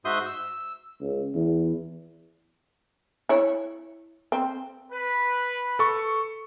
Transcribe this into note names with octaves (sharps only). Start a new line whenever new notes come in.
G#2 F#4 E5 C6 D#6 G6
E6
C#2
E2
E4 C#5
C4
B4
A4 C#6